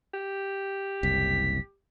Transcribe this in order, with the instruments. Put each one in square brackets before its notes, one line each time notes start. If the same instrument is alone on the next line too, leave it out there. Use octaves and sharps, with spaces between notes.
[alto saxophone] G4
[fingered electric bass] F#1 C2 [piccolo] B6